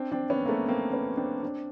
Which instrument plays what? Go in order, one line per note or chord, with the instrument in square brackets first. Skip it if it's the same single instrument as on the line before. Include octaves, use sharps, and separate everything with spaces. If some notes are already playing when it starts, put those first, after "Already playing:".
Already playing: [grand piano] C4 D4
C4 D4
B3 C#4
A#3
A3 B3
A#3 C4
B3 C#4
C4 D4
C4 D4